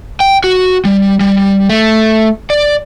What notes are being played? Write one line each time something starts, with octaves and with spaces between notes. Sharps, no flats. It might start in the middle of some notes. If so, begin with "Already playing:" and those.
G5
F#4
G3
G3
A3
D5